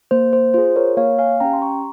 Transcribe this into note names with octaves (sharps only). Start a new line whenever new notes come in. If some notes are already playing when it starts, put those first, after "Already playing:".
A#3 C5
C5
F4 G#4 C5
A#4 C#5
A#3 C#5 F5
F5 G#5
C#4 G4 G5 A#5
C6
A#5 C#6